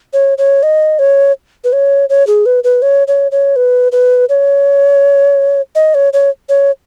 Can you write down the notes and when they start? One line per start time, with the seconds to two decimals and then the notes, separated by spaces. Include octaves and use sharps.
0.13 C#5
0.38 C#5
0.63 D#5
0.99 C#5
1.64 B4
1.73 C#5
2.09 C#5
2.27 G#4
2.46 B4
2.64 B4
2.82 C#5
3.07 C#5
3.31 C#5
3.56 B4
3.92 B4
4.29 C#5
5.75 D#5
5.94 C#5
6.13 C#5
6.49 C#5